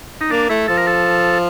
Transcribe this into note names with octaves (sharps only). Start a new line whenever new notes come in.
D#4
A#3 D4
A3 E4
F3 A4
A#4
A4